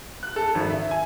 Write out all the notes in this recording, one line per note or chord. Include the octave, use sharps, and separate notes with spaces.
F#6
A4
G#1
E5
G#5